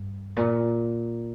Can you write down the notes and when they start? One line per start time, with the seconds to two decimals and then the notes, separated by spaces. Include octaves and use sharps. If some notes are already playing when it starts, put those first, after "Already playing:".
Already playing: G2
0.37 A#2